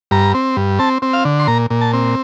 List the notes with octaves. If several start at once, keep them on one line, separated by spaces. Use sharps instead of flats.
G2 A#5
C4
G2
C4 A5
C4
F5
D3
C6
A#2 A#5
A#2
A5
C4